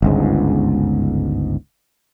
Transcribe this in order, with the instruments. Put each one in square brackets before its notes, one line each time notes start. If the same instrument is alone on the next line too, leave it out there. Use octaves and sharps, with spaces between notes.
[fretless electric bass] G1 C#2 G#2